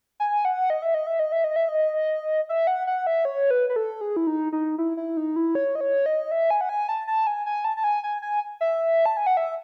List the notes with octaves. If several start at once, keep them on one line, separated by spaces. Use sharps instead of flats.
G#5
F#5
D#5
E5
D#5
E5
D#5
E5
D#5
E5
D#5
E5
F#5
F#5
E5
C#5
B4
B4
A4
G#4
E4
D#4
D#4
E4
E4
D#4
E4
C#5
D#5
C#5
D#5
E5
G#5
F#5
G#5
A5
A5
G#5
G#5
A5
A5
G#5
G#5
G#5
E5
A5
G#5
F#5
E5